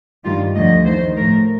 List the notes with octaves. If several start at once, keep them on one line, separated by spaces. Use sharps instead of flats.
G2 D#3 G3 F4
D2 D3 F3 A3 D#5
D#2 D#3 A3 C5
A2 F3 A3 A#4